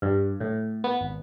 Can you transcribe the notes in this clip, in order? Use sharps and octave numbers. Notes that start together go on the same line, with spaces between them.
G2
A2
B3
G#1